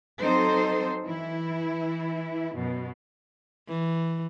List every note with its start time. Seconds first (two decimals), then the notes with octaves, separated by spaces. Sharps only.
0.20 F#3 C4 D#4 A4 C5
1.04 E3 E4
2.55 F#2 B2
3.68 E3